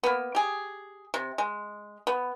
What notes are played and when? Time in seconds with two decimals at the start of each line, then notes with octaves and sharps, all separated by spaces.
0.03 A#3 B3
0.35 G4 G#4
1.14 C3
1.38 G#3
2.07 B3